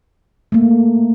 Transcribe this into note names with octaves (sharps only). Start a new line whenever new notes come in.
A3 A#3